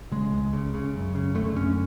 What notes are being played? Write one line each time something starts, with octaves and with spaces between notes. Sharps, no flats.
C#3 G#3
C#2
C#3
C#3
F#2
C#3
D3 A3
F#2 C#4